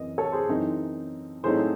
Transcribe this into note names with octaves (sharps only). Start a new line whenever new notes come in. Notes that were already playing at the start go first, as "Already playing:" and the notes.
Already playing: F#2 E3 C4 D#5
A4 C#5
G#4 C5
F#2 E3 C4 D#4
A2 F#3 A3 C4 D#4 G#4 C5